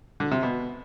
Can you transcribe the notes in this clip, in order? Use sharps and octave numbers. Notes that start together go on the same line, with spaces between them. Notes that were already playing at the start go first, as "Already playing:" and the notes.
D3
C3
B2